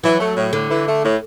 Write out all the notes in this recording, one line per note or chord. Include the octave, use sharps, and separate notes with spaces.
E3 F#3
A3
A2
A2 D3
E3
A3
A2